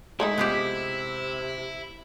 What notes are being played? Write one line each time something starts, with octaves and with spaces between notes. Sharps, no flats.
G#3 A3 D#4 E4 G#4
C3 B3 F4 G4